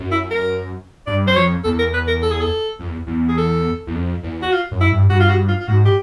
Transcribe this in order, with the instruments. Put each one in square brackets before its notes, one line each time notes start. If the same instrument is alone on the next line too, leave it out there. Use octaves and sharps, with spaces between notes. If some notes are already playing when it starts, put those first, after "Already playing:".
Already playing: [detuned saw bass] F#2
[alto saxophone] E4
A#4
[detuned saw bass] G2 [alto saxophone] D5
[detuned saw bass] F#2 [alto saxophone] C5
[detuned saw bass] F2 [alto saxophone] C#5
[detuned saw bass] E2 [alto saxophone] A4
[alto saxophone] A#4
B4
A#4
A4
G#4
A4
[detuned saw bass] F2
E2
E2
[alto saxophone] G#4
A4
[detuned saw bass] E2
F2
E2
[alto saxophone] F#4
F4
[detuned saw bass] F#2
[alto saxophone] E4
[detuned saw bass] G2
[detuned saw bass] G2 [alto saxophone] F#4
[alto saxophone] F4
F#4
F4
F4
[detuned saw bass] G#2 [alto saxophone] F#4
[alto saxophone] G4